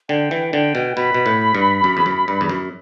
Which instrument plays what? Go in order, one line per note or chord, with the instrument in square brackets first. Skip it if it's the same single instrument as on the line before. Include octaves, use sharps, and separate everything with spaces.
[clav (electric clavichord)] D3 [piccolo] G5
[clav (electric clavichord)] E3
[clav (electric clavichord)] D3 [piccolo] G5
[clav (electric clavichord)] B2
[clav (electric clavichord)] B2 [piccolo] B5
[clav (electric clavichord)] B2
A2
G2
F#2
E2
F#2
G2
E2
F#2